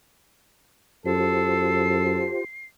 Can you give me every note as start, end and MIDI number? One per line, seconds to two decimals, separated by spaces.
1.06 2.28 42
1.06 2.45 65
1.06 2.45 67
1.06 2.35 69
1.06 2.45 72
1.06 2.66 96